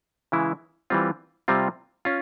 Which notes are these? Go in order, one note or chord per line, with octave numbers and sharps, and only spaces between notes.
C#3 E3 G#3 E4
E3 G3 C4 F4
C3 G3 C4 F4
C#4 F4